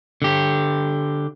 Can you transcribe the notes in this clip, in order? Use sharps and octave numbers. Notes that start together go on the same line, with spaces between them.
D3 G4